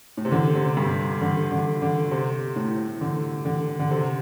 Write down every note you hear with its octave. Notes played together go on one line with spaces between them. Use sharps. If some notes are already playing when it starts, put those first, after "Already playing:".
A2
C3
D3
C3
G2
D3
D3
D3
C3
A2
D3
D3
D3
C3